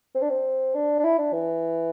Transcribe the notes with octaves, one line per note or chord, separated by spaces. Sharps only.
C4
D4
C4
D4
D4
E4
D4
E3